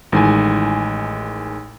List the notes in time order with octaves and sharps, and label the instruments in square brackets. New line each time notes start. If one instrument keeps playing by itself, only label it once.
[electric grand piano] A1 D#3 G#3 E4 G#5